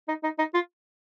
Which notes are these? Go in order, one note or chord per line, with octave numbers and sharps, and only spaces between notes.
D#4
D#4
D#4
F4